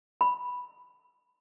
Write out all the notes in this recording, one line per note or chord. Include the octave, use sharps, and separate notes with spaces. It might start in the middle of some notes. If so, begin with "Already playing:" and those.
B5